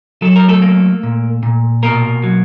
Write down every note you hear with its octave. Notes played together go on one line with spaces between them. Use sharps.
F#3 A4
A#4
A3 A4
A#3
A#2
A#2
B2 A#3 A#4
F#3